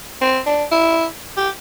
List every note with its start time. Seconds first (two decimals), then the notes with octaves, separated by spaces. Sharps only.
0.22 C4
0.46 D4
0.72 E4
1.37 G4